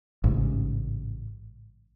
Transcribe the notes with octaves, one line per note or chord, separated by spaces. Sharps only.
A1 G#2 C#3